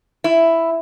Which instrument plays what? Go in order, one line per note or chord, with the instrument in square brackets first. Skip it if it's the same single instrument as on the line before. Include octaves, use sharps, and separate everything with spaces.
[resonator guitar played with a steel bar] E4